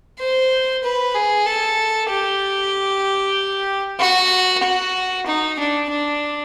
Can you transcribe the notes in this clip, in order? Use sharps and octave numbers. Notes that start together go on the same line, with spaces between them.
C5
B4
G#4
A4
G4
F#4
F#4
D#4
D4
D4